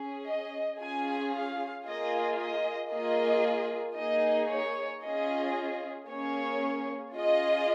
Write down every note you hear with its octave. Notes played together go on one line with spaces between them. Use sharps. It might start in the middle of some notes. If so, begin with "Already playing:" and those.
Already playing: C#4 G#4
D#5
C#4 F4 G#4 G#5
F5
A#3 F4 G#4 D#5
D#5
A#3 F4 G#4 D#5
A#3 D#4 G#4 D#5
C#5
C#4 F4 G#4 D#5
A#3 C#4 G#4 C#5
C#4 F4 G#4 D#5